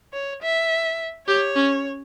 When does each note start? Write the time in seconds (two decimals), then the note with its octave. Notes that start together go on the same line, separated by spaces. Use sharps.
0.13 C#5
0.42 E5
1.27 G4 C#5
1.56 C#4